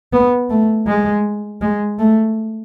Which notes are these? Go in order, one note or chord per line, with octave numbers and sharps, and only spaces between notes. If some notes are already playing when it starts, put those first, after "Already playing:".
B3
A3
G#3
G#3
A3